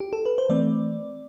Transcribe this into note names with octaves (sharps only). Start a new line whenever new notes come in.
G4
A4
B4
C5
E3 A3 C4 D5